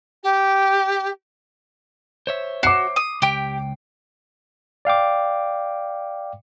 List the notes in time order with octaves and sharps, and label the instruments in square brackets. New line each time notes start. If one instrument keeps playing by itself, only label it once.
[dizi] G4
[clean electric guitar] C5 C#5 E5
[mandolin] F#4 [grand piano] D6 C7
[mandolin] D#6
[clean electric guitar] C#2 G5 [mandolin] G4
[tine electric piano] D5 F5 G5 D6